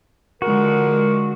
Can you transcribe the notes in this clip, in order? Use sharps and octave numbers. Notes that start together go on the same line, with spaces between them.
D3 F3 G#3 F#4 A#4